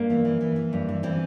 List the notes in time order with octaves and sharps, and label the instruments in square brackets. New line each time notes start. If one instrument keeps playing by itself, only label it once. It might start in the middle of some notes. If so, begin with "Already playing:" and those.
Already playing: [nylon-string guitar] G2 A#3
E3
E3
E3
E3
G2
E3
E3 C4